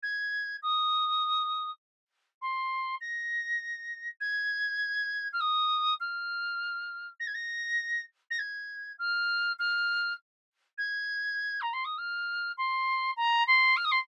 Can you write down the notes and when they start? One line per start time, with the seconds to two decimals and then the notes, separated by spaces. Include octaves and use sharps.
0.02 G#6
0.62 D#6
2.41 C6
3.01 A#6
4.20 G#6
5.32 F6
5.40 D#6
6.00 F6
7.19 A#6
7.27 G#6
7.34 A#6
8.30 A#6
8.39 G#6
8.98 F6
9.59 F6
10.77 G#6
11.61 A#5
11.73 C6
11.84 D#6
11.98 F6
12.57 C6
13.16 A#5
13.47 C6
13.76 F6
13.84 D#6
13.91 C6